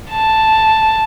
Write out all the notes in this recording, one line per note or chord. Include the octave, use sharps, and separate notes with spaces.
A5